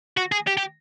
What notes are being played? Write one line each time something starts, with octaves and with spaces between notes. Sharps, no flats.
F#4
G#4
G4
G4